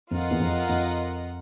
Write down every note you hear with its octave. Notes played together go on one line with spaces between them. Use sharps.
F2 F4 A#4 D#5 F#5
E2
F2
F2